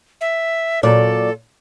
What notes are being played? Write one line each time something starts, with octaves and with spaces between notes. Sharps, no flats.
E5
A#2 F#3 A4 D5